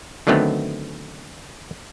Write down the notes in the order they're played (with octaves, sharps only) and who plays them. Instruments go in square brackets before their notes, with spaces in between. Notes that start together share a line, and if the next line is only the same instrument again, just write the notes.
[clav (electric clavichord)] D3 D#3 F#3 A3 B3 C4